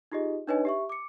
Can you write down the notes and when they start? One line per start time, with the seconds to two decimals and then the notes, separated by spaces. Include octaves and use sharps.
0.12 D#4 F4 G4 G#4 D#5
0.47 D4 D#4 B4 C#5 D#5 G#5
0.65 G4 E5 C#6
0.89 D6 C#7